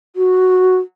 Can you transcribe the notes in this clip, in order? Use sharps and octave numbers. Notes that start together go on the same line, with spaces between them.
F#4